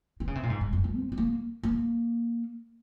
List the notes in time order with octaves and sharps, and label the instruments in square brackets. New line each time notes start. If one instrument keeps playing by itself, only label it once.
[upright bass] D#3
C#3
C3
A#2
G#2
G#2
F#2
F3
C4
C4
A#3
A#3